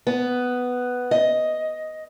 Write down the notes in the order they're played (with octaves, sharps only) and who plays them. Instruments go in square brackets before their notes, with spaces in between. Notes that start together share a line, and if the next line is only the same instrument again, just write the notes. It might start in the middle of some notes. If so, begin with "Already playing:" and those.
[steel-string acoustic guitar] B3
D#5